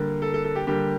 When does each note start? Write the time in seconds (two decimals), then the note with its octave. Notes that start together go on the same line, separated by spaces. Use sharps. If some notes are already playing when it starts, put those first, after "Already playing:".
Already playing: D3 G3 A#3
0.22 A4
0.34 A4
0.45 A4
0.55 G4
0.67 D3 G3 A#3 G4